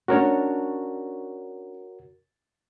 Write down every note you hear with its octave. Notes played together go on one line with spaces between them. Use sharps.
C#4 D4 F#4 A#4 C#5